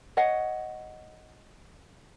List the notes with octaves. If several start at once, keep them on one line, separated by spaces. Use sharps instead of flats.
C#5 D#5 F#5